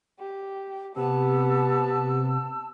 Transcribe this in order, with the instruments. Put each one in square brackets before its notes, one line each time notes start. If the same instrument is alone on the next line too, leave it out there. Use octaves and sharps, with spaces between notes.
[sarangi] G4
[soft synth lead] C3 [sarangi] B3 [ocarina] G4 [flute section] A5 E6